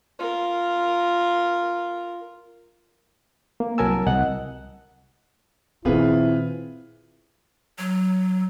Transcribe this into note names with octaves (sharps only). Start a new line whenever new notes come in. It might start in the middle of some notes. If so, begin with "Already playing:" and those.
F4 A#4
A#3
C2 F#3 A#4 G#5 A5 E6
C2 D#5 F#5 F#6
A#2 D#3 C4 E4 F4 G#4 B4
F#3